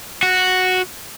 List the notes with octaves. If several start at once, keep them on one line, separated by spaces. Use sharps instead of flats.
F#4